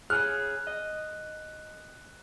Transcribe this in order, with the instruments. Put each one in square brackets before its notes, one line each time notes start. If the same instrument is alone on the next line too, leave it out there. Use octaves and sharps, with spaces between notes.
[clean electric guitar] G#4 C#5 G#5 [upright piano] F6 [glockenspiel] F#6
[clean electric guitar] D#5